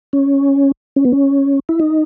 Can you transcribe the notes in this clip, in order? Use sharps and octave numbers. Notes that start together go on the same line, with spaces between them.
C#4
C#4
B3
C#4
E4
D#4